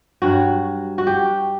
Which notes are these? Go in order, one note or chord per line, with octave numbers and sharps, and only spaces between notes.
G2 F#3 F#4
F#4
G4